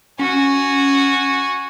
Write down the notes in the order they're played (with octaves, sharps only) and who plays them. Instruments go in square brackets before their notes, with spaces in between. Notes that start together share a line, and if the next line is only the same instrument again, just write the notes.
[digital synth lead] C#4 [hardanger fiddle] F#4 G#5